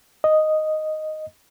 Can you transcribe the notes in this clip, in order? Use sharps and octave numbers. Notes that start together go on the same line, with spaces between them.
D#5